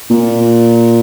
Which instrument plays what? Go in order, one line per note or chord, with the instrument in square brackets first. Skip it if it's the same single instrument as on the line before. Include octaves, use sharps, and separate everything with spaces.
[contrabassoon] A#2